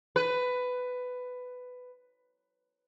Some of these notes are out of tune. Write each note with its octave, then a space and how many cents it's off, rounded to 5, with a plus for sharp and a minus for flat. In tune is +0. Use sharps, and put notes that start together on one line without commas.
B4 +15